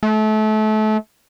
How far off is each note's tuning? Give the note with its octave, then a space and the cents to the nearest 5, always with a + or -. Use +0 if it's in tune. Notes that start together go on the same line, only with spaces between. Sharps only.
A3 -30